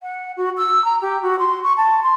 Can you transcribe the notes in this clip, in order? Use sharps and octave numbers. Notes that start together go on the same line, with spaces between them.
F#5
F#4
E6
A#5
G4
F#4
C6
C#6
A5
C6